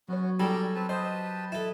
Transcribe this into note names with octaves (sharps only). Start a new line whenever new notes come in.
F#3 B3 C#4 F#4 C#5
G3 G#4 A4 D5 A#5 E6
C4 B4 A5
G4 B4 C5 D#5 A5
E4 A4 B4